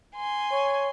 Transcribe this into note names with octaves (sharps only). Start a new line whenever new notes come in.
G#5 C6
C#5